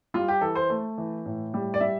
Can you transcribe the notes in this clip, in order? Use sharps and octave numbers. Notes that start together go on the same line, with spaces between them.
G3 F4
G4
E3 A4
C5
A3
E3
A2
G3
D5
G3 E5